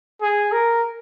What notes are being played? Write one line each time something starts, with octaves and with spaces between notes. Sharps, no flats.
G#4
A#4